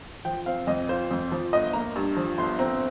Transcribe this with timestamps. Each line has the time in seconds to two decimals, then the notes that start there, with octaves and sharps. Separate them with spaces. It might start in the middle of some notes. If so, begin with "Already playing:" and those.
0.25 F3 G5
0.46 C4 F5
0.67 F2 D#5
0.89 F4 C5
1.11 F2
1.32 F3
1.53 G1 D#5
1.73 A#3 A#5
1.96 G2
2.16 F3
2.38 G1 C6
2.59 C4 A#5